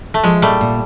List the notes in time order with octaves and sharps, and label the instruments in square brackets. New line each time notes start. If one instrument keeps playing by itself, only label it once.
[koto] A3
[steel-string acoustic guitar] F3 [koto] G#3
[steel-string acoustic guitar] A#2 [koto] G3 A3
[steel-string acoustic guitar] A#2